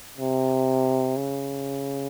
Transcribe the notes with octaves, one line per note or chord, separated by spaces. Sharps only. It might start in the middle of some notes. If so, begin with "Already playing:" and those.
C3
C#3